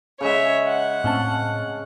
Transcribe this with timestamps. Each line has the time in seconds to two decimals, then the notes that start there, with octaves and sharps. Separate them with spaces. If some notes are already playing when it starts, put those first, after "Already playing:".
0.21 C#3 G#3 C#5 E5
0.67 F#5
1.04 A2 C4 C#4 A5